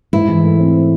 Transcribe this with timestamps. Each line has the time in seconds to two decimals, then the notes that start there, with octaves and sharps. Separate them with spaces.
0.13 G#2 E4
0.29 E3
0.43 A3
0.59 C4